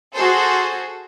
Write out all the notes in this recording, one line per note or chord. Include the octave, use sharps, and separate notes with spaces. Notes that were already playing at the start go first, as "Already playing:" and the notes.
F#4 G#4 A4 C5